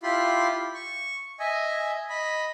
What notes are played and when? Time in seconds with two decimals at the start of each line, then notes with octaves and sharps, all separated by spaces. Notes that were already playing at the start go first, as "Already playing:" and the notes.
0.03 E4 F4 G4 B5 C6
0.74 C#6
1.40 D#5 E5 G#5
2.10 D#5 B5